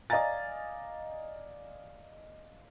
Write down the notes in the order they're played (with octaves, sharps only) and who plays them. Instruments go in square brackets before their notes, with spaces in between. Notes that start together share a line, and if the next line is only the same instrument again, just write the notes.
[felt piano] D5 D#5 F5 G#5 A#5 A6